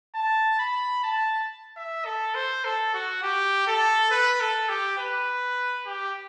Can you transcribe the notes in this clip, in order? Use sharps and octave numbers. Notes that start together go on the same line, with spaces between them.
A5
B5
A5
E5
A4
C5
A4
F#4
G4
A4
B4
A4
G4
B4
G4